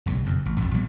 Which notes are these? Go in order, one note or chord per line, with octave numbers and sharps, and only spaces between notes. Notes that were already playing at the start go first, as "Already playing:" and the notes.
F#1 B1 G2
F#1 F2 B2
A1
A#1 F2 G#2 F3
F3 G3 A#3 B3